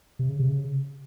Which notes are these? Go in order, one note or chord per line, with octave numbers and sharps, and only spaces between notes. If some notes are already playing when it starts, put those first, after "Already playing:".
C3
C#3
C3
C#3